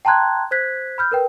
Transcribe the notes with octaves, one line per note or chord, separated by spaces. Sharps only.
G5 A5 A#5 C6 F#6 G#6
C5 F#6 G#6 B6
B5 F6 G6
A#4 B4 G5